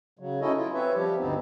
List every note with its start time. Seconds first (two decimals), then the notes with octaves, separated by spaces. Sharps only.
0.19 C#3 F#3
0.41 C#4 D#4 E4 F#4 A4 D#5
0.56 E4 F4
0.74 C4 B4 C#5 E5
0.94 F3 G3 G4
1.19 D2 G2 B3 C4 D#4